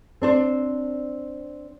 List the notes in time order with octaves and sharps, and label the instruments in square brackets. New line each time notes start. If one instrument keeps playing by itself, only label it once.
[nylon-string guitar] C4 D4 C5